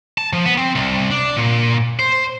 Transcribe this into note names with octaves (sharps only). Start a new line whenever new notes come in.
A5
F3
B3
C4
C2
D4
A#2
C5